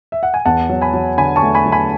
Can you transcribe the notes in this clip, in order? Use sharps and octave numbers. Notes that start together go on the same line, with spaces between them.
E5
F#5
G#5
E2 F#5 A5
F#3
G#5 B5
F#3
D3 G#5 B5
A5 C#6
A3
G#5 B5
F#3
G#5 B5